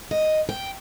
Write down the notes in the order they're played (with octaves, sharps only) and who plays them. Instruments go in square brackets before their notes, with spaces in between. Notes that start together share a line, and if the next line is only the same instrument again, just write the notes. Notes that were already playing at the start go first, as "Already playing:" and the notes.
[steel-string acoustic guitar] D#5
G5